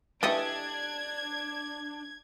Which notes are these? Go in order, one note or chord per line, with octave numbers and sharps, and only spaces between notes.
E3 A3 D4 G4 A4 D#5 G#6